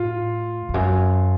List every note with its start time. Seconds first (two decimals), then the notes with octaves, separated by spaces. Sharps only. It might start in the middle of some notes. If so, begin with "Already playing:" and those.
Already playing: A2 F4
0.69 F2
0.74 F#2